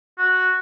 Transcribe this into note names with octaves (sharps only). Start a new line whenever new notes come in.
F#4